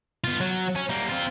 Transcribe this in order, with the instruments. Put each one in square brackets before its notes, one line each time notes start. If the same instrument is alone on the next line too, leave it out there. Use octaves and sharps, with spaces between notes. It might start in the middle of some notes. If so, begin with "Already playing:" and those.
[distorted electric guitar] B3 F4
F#3
C#4
G3 A#3
C4 F4